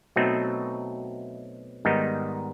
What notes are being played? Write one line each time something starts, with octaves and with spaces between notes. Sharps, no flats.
B2 F#3 A3 C4 D#4
G#2 D#3 G3 B3 D#4